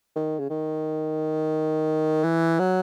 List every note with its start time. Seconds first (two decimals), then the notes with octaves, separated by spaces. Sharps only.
0.16 D#3
0.39 C#3
0.50 D#3
2.24 E3
2.59 F#3